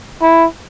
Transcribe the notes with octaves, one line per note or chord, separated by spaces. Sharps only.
E4